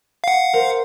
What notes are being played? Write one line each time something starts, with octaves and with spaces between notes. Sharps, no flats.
F5 F#5
A#4 C5